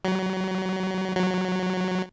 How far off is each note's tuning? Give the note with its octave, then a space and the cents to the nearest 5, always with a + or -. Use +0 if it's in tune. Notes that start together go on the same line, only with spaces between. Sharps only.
F#3 +25
F#3 -5